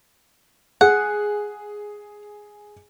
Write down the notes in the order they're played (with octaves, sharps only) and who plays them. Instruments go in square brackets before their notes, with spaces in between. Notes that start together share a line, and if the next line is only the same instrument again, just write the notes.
[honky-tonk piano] G#4 [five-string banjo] F#5